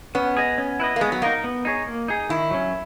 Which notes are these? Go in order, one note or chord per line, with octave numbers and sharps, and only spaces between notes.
B3 C#4
G#4 D#5
C#4
E4 B4 D#5
A#3
G#3 B3
F#3
A#3 D#4 A#4 D#5
B3
D#4 G#4 C#5
A#3
D#4 G#4
D#3 E4
F#3 C#4